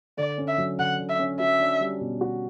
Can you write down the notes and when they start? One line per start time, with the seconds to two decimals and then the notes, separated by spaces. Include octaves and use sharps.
0.17 D3 D5
0.38 C#4
0.48 E5
0.58 F#3
0.79 D3 F#5
0.99 D3
1.09 E5
1.19 C#4
1.40 F#4 E5
1.60 D4
1.80 G3
2.01 B2
2.21 F#4